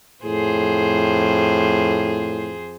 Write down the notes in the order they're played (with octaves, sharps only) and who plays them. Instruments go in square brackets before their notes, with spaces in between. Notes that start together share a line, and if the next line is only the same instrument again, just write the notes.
[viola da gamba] F2 G#4 C5 [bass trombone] A2